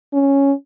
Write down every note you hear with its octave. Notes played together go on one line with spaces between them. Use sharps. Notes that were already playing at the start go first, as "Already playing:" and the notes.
C#4